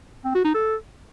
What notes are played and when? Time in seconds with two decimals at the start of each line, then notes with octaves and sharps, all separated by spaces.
0.25 C4
0.35 F#4
0.45 D#4
0.54 A4